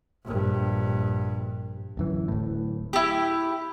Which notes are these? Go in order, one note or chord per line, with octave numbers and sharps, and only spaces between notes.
A#1 G2
D1 F#2 E3
D1 A2
E4 G4